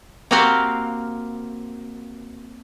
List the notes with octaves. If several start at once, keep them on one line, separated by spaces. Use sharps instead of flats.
A#3 C4 F#4 G4 A#4 F5